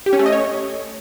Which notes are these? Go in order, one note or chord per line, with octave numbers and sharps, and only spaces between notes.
G4
C#4
A3
D#5
C#5